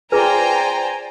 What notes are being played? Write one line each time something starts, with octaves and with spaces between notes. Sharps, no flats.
F4 G#4 B4 C5 D5 G5 G#5 A#5